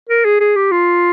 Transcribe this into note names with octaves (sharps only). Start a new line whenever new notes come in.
A#4
G#4
G#4
G4
F4